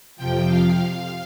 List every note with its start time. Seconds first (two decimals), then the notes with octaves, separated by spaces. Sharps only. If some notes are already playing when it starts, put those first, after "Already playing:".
0.16 F2 C3 F3 G5
0.47 F5